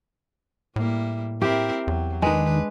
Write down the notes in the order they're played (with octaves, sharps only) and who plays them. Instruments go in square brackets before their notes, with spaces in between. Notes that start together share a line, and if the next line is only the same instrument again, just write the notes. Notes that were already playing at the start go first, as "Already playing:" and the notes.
[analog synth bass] A2 [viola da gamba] G3 A#3 E4
[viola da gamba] C4 E4 A#4 [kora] G4
[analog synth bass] E2 [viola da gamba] F#3
[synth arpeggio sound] D#3 D#4 [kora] G#3 [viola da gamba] D4 B4